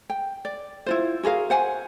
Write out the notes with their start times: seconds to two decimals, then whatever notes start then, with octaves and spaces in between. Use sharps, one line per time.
0.10 G5
0.45 D5
0.86 E4 F4 C5
1.23 F#4 G#4 A#4 F5
1.50 C5 F#5 G#5